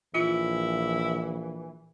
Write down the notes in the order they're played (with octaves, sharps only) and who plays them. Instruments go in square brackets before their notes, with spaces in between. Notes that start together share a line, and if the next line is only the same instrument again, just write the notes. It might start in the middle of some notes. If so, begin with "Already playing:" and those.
[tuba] A#1 [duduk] E3 [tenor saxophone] E4 [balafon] F4